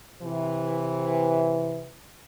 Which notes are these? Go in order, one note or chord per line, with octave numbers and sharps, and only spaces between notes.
C3 E3